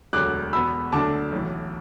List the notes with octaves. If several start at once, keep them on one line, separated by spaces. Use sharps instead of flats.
E1 D2 D3 F#3 D6 F#6
E2 B2 B3 B5 E6
D2 D3 F#3 A3 D4 A5 D6
B1 A2 E3